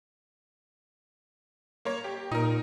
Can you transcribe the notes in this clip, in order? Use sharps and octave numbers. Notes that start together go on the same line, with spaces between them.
A#3 C#5
G4
A#2 D#4 A#4